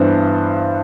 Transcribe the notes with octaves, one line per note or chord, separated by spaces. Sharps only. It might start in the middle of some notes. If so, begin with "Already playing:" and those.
Already playing: G2 E3 B3 D4 C5